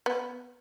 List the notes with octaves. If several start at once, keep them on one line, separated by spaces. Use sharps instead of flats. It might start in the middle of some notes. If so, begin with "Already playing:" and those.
B3